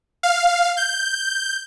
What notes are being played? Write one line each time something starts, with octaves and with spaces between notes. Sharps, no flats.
F5
G6